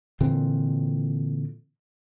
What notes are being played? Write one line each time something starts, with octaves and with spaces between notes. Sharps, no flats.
A#2 D3 E3 C4